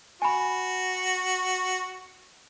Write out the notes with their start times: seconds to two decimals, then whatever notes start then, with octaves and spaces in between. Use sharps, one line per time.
0.22 F#4 G#5 B5